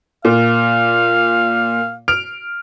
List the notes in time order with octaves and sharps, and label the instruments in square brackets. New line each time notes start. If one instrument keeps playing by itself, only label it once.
[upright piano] A#2 [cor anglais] F5
[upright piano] F6 D7 F7